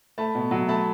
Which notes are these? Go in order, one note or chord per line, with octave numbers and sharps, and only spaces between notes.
A3 A5 B5
B2
F#3
A3 A5 B5